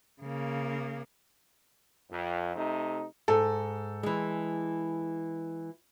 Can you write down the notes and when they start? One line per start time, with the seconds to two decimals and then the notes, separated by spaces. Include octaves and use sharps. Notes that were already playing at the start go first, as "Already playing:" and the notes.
0.22 C#3 A#3
2.11 F2
2.56 C3 A3 D#4
3.28 G#2 A4
4.03 E3 G#3